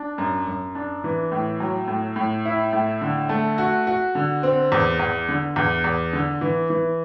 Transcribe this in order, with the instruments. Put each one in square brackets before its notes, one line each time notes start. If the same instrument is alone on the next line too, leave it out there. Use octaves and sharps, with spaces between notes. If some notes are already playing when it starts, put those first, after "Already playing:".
Already playing: [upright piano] D4
F#2
F#2
D4
E3
A2
F#3
A2
A2
E4
A2
D3
A3
F#4
F#4
D3
C4
E2
E2
D3
E2
E2
D3
E3
E3